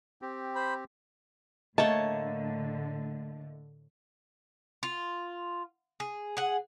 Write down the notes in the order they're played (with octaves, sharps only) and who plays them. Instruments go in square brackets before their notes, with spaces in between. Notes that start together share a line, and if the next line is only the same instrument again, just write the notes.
[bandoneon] C4 G4
[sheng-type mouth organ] C5 B5
[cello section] A2 D3 [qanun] A3 A#3 C#5 [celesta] D#5 [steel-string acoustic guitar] A5
[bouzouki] F4
G#4
G#4 F#5